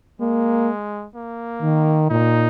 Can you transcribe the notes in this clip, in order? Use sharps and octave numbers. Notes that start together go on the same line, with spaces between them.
G#3 A#3
A#3
D#3
A#2 D#4